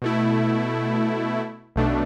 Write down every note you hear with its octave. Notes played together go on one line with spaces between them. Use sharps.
B2 A3 E4
B1 B2 A3 D4